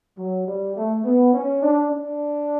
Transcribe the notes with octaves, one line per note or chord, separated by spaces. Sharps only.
F#3
G3
A3
B3
C#4
D4
D4